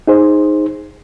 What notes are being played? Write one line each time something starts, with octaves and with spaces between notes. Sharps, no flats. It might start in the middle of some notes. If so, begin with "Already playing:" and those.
D#4 G#4 C5